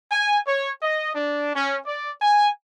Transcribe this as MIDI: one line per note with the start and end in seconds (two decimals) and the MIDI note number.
0.12 0.39 80
0.47 0.70 73
0.83 1.12 75
1.15 1.53 62
1.56 1.77 61
1.86 2.12 74
2.22 2.49 80